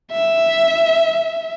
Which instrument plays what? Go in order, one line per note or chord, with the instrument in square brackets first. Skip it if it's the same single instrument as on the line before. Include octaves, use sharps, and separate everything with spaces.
[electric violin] E5